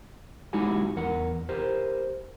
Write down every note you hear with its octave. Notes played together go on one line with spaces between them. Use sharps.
G#3 D#4 E4 F#4 G4 G#5
E2 A#4 F#5
G4 A#4 C5